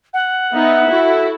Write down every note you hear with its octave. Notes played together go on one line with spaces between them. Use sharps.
F#5
B3 D#4 E5
E4 F#4 A4